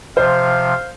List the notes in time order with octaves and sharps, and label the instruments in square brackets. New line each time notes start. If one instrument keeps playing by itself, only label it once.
[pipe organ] C3 F3 [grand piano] C5 [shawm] F5